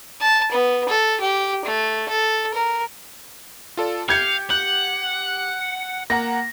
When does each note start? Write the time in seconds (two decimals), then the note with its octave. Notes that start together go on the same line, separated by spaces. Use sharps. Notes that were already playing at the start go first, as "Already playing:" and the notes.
0.21 A5
0.51 B3
0.89 A4
1.21 G4
1.65 A3
2.08 A4
2.54 A#4
3.77 F4 A4 D5
4.09 G4 F5 G6 G#6 C#7
4.50 F#5 G6
6.10 A#3 F#5 A#5 A#6